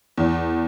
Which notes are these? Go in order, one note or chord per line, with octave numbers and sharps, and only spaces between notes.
E2